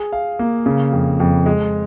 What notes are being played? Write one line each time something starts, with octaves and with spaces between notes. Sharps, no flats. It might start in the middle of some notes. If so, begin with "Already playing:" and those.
Already playing: G#4
F5
A#3
C#3
F2
F2
G#3